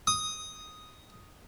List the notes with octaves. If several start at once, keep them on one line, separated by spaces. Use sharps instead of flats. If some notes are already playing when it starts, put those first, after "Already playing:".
D#6